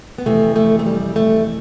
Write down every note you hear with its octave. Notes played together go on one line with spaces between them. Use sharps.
B3
F2 C3 E3 A3
A3
A3
G3
A3